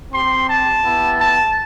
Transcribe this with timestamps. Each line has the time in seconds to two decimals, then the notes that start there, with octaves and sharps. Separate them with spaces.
0.12 C4 G4 C6
0.48 A5
0.83 B3 E4 G4
1.19 A5